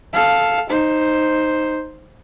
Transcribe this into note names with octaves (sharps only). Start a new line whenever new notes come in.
A4 F5
D#4 C5